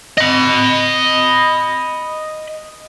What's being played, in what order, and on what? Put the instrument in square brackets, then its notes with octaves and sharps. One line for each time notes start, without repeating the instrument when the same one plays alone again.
[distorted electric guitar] D#5 B5